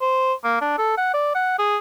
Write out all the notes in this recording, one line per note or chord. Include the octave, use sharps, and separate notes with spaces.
C5
A#3
D4
A4
F#5
D5
F#5
G#4